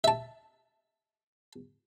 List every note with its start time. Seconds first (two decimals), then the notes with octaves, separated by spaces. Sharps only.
0.04 E5 A5